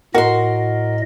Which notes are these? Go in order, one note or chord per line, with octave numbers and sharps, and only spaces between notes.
A2 F#4 A#4 D#5 C6